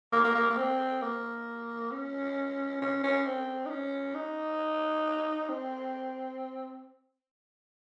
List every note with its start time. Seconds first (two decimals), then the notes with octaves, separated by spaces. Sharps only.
0.13 A#3
0.24 A#3
0.35 A#3
0.50 A#3
0.58 C4
1.02 A#3
1.92 C#4
2.82 C#4
3.03 C#4
3.26 C4
3.66 D#4
3.70 C#4
4.15 D#4
5.49 C4